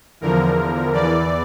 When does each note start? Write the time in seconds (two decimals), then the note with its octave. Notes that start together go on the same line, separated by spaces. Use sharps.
0.21 E2 D3 F3 A#4
0.93 E2 E3 D5